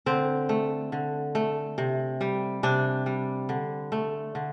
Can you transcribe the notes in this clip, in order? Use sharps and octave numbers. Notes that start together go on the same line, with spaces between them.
D3 C4
A3
D3
A3
C3
G3
C3 D4
G3
D3
A3
D3